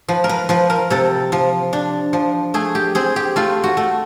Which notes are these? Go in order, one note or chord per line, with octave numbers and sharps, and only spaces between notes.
F3 B4
A#4
B4
F3 B4
A#4
C3 A4
F3
D4
F3
A3 G#4
G4
C4 G#4
G4
A3 F4
F#4
A3